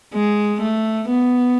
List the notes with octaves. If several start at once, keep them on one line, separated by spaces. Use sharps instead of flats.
G#3
A3
B3